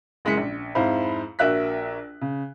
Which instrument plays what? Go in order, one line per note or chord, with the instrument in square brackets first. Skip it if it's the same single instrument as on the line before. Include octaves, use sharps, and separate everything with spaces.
[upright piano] F#1 G#3 E4 G#4 B6 C#7
A#1
F2 G#2 E4 C5 F5 B5
A#1 F#4 A#4 E5 F#6 B6
C#3